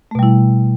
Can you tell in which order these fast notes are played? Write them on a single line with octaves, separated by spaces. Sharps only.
A3 B2 G3 E4